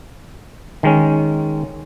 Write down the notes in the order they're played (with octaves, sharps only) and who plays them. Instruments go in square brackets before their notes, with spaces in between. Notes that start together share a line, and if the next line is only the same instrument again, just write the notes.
[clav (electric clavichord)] D#3 G#3 C#4